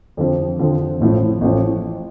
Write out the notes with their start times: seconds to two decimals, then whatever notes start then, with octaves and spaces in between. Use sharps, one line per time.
0.17 F2 D3 F3 C4
0.59 F2 D3 F3 C4
1.00 A1 A2 F3
1.41 A1 A2 F3